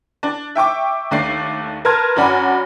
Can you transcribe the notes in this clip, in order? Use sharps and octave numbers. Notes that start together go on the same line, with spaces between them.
D4
E5 G5 C#6 D6
D#2 A3 D4 D6 C7
A#4 B4 A5 C6 F6 G#6
F#2 D4 F#4 D5 G#5 B5